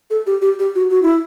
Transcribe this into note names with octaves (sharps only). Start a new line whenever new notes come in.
A4
G4
G4
G4
F#4
F#4
E4